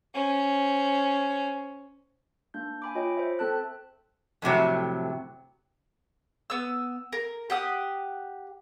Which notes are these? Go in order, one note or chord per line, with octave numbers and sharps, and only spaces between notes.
C#4 C5
A#3 D4 G6
G#5 B5 D6
F4 C#5 D#5 G5
C5 E5
C4 A4 A5 F#6
F2 A2 C3 F#3
B3 E6
A#4
G4 F#5 D#6